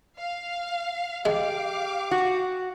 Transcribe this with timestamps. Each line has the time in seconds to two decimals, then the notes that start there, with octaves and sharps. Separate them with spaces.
0.18 F5
1.25 G#3 G4 F5 D6
2.11 F#4